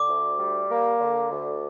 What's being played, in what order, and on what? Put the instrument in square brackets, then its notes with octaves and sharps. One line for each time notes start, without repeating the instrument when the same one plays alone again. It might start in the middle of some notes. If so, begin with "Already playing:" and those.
Already playing: [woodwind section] D3 [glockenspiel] D6
[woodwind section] D2
G3
A#3
D3
D2